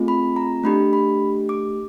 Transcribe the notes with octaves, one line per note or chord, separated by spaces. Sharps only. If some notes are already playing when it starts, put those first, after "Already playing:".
Already playing: A3 C4 F4 G#4
B5
A#5
A3 D4 G4 B5
B5
D6